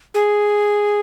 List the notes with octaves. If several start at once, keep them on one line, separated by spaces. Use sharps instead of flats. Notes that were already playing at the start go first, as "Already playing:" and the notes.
G#4